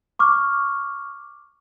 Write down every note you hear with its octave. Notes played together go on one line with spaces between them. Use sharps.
C#6 D6 F6